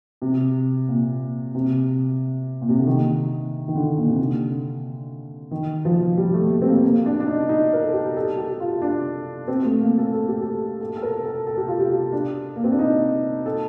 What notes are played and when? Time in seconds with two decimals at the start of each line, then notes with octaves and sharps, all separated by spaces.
0.22 C3
0.88 A#2
1.55 C3
2.61 A#2
2.69 C3
2.78 D3
2.87 D#3
3.68 D#3
3.75 D3
3.97 A#2
4.09 C3
4.20 D3
5.51 D#3
5.85 F3
6.18 G3
6.34 A3
6.50 A3
6.62 C4
6.68 A#3
6.83 A#3
7.06 D4
7.20 D4
7.27 D#4
7.49 D#4
7.73 A#4
7.83 A4
7.93 G4
8.16 A4
8.37 G4
8.60 F4
8.82 D4
9.48 C4
9.65 A3
9.81 A#3
9.98 A4
10.14 A4
10.28 G4
10.42 A4
10.80 A4
10.97 A4
11.03 A#4
11.24 A4
11.47 A4
11.57 G4
11.68 F4
11.80 G4
12.12 D4
12.56 A#3
12.64 C4
12.72 D4
12.79 D#4
13.46 A4